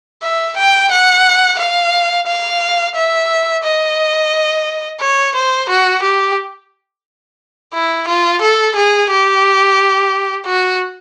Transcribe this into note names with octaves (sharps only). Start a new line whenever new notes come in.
E5
G5
F#5
F5
F5
E5
D#5
C#5
C5
F#4
G4
E4
F4
A4
G#4
G4
F#4